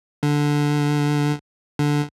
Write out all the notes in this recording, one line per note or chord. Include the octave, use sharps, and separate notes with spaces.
D3
D3